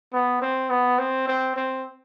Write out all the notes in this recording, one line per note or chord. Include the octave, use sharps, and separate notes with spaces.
B3
C4
B3
C4
C4
C4